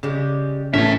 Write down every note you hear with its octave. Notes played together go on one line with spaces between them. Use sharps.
C#3 G3 G#3 G4
A1 A2 C#4 A#4 C#5 E5 A5